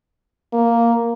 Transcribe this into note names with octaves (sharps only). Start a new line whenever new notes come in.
A#3